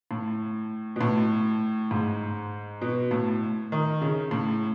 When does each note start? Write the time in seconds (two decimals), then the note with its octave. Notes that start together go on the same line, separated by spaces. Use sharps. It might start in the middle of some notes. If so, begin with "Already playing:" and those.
0.11 A2
0.96 B2
1.01 A2
1.91 G#2
2.82 B2
3.11 A2
3.72 D#3
4.01 C#3
4.31 A2